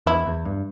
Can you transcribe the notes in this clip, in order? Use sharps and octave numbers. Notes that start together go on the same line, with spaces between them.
E2 E4
E2
G2